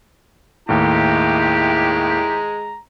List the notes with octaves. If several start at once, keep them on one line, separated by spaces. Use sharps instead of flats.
D#2 A2 G#3 E4 G4 A#5